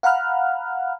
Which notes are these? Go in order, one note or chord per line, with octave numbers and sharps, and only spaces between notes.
F5 F#5 A#5 B5 F6 F#6